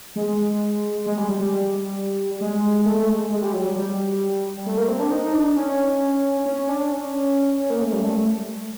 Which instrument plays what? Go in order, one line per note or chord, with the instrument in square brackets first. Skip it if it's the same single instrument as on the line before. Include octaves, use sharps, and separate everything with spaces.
[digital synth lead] G#3
G#3
G3
G3
G3
G#3
A3
G#3
G#3
G3
F#3
G3
G3
A3
A#3
C4
D4
D#4
D4
C#4
C#4
D4
C#4
A#3
A3
G3
A3